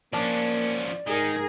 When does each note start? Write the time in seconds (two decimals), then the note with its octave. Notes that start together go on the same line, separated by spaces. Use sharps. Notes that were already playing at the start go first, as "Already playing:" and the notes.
0.13 F3 A#3 C#4 D5 A5
1.07 G#2 D#3 G#4 A#4